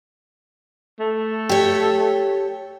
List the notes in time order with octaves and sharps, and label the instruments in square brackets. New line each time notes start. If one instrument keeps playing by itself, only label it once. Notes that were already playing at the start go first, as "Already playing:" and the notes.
[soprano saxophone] A3
[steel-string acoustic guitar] G4 C#5